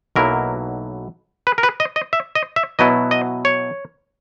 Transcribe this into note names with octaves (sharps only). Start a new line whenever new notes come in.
B1 B2 F#3 A#3 E4 A#4
B4
A#4
B4
D#5
D#5
E5
D#5
E5
B2 F#3 B3 E4 D#5
D#5
C#5